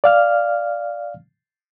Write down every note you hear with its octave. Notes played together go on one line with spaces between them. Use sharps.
D5 F5 F6